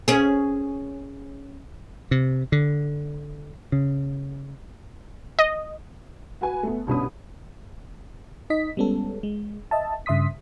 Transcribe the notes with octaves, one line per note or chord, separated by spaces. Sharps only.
C#4 G#4
C3
D3
C#3
D#5
F#4 B4 G#5
A3 B3
C2 B2 D3 C#4 B5 D#6
D#4 D#5 B6
G3 G#3 B3 C#4 A4
G#3
D#5 E5 A5
G2 C#3 E5 C6 D#6 B6